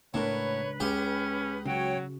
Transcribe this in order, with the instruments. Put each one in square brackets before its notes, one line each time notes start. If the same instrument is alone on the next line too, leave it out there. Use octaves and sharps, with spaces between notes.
[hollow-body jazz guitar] C#2 D4 A#4 [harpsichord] A2 [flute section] B4 [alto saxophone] C#5
[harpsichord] C#2 G4 [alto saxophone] C#4 [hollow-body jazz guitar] G#4
[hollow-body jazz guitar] C#3 F#4 [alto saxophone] F#3 [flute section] C#5 G5